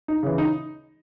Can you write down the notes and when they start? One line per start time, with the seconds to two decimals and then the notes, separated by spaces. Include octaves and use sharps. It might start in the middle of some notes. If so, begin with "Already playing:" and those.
0.08 D#4
0.23 C#3 E3
0.38 D#4